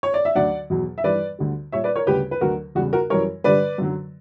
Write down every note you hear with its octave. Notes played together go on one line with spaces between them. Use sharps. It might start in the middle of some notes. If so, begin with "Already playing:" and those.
C#5
D5
E5
D2 D3 F#3 D5 F#5
E2 B2 F#3
E5
G2 E3 G3 B4 D5
D2 D3 G3
A#2 G3 C#5 E5
B4 D5
A#4 C#5
D2 C#3 G3 G4 B4
B4
D2 D3 F#3 F#4 A#4
E2 C#3 G3 F#4
F#4 A#4
F#2 E3 G3 A#4 C#5
G2 D3 G3 B4 D5
F#2 D3 F#3